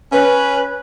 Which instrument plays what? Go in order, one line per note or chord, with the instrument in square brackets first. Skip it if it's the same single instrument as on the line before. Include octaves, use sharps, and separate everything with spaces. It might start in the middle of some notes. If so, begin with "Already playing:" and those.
[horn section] C#4 B4